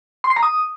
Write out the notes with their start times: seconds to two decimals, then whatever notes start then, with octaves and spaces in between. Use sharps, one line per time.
0.24 C6
0.30 C7
0.36 A#5
0.43 D#6